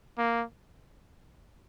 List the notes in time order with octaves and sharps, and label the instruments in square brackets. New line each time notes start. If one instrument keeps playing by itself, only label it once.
[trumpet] A#3